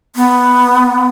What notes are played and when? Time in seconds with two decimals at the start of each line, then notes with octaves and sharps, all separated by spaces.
0.16 B3